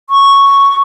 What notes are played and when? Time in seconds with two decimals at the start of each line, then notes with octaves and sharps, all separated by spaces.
0.10 C#6